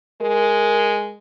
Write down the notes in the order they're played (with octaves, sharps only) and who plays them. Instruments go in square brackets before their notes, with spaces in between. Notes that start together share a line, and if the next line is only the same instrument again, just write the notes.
[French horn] G#3 [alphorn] A#4